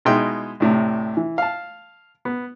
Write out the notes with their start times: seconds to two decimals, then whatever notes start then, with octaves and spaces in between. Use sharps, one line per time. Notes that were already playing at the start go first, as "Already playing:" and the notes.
0.05 B2 G#3 D#4 E4 G5 C6
0.60 D2 A2 C3
1.17 E3
1.38 F5 A5
2.25 B3